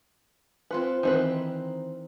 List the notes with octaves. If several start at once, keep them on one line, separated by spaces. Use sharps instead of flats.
C4 F4 B4 F#5
D#3 E3 C4 D#4 B4